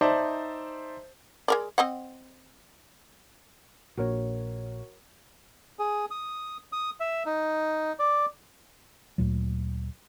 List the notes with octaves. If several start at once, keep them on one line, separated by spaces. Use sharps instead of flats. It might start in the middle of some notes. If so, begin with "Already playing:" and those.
D#4 C5 D5 E5 A5
G#3 A#4 D5
C4 D#5 F#5
A#1 A#2 F#4 A#4 C#5
G#4
D#6
D#6
E5
D#4
D5
D2 A#2 F#3